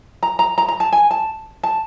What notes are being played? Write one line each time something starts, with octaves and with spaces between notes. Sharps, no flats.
A#5
A#5
A#5
A#5
A5
G#5
A5
A5